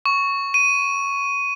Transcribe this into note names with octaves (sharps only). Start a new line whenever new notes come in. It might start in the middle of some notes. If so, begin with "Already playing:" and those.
C#6
D#7